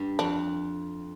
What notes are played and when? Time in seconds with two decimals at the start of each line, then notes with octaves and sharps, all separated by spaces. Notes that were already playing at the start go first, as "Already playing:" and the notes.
Already playing: G2
0.19 F2 D4